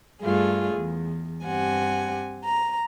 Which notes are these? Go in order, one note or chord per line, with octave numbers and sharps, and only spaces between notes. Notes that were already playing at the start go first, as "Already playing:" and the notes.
G2 G3 A3 F4 G#4
E2
G2 C4 G4 F#5 G#5
A#5